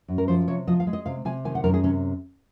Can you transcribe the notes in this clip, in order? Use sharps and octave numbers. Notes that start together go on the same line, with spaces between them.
F#2
A#4
F3 C5
C3 C#5
F3 D#5
F5
G#3
D#5
C3 F5
C3 G#5
D#3 G#5
F#5
F#2 A#4
G#4
C3 C#4